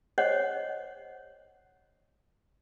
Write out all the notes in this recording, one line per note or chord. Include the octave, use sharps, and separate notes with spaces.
C5 C#5 D#5 F#5